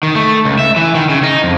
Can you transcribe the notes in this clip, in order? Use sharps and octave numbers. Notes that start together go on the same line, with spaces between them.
D#3
A3
C#2
E5
E3
D#3
C#3
D#4
F2